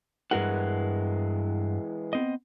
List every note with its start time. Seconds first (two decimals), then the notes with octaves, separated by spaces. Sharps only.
0.31 G2 E3 G#3 A#4 F#5
2.13 B3 C4 D#5